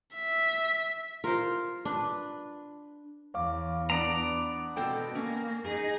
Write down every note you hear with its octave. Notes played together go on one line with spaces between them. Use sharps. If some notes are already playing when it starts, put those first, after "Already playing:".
E5
F4 A#4 C5
D4 B4
E2 C#5 F5 D6
B3 D4 D5 A#5
B2 C4 A4 G5
A#3 C#4
D#4 G#4